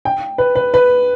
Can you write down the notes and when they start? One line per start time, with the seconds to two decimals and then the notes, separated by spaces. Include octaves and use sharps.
0.05 G5
0.38 B4
0.55 B4
0.74 B4